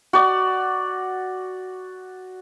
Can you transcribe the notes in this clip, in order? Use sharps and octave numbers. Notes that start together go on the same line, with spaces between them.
F#4 D5